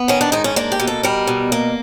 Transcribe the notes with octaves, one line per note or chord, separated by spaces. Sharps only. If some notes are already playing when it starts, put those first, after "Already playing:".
Already playing: B3
D#3 C#4
D4
G#2 D#4
C#4
A#3 D4
G4
B2
A4
G3 A#4
B2
A#3